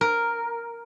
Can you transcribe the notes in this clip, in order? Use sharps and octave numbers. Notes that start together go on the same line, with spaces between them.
A#4